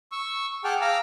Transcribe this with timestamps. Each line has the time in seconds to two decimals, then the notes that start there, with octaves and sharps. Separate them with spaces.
0.12 C#6 E6
0.64 G#4 F#5 G5 A5 D6 F6
0.81 F5 A#5 D6 E6 F6